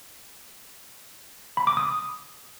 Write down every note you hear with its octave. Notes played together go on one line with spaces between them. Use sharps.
B5
D6
D#6